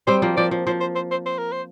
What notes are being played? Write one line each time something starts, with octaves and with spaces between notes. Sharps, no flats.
G3 C4 C5
F3 A#3
F3 D5
F3
F3 C5
C5
C5
C5
C5
A#4
C5